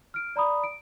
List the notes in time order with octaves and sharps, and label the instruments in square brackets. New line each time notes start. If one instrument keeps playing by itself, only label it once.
[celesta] F6 D7
D5 A#5 B5 D#6
D7